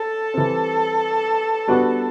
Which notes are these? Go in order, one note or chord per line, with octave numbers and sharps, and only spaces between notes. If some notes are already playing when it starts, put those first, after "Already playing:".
Already playing: A4
E3 G3 C4
G3 B3 D4 F#4